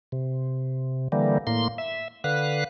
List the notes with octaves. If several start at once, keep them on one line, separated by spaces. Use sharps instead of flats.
C3
D3 E3 G3 A#3
A2 A#3 C6
E5
D3 B4 F5 F#6